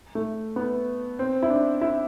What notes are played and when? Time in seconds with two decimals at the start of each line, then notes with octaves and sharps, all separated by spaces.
0.15 A3
0.56 B3
1.19 C4
1.43 E4
1.50 D4
1.81 E4